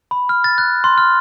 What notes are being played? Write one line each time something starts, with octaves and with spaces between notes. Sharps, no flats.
B5
F6
A6
F#6
C6
F6